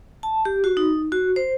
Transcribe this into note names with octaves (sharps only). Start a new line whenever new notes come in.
A5
G4
F#4
D#4
F#4
C5